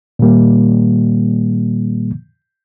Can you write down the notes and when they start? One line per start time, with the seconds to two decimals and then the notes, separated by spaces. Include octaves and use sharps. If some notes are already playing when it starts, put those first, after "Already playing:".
0.19 A#2 D#3 G3 A#3